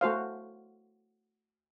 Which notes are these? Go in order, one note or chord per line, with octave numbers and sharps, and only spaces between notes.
A3 F#4 C5 F5